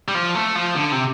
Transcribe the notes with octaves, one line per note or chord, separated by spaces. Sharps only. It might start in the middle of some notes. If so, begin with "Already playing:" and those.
G3
F3
A3
F3
D3
C3